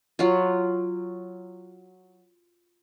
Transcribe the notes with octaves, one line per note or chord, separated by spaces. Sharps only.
F#3 F4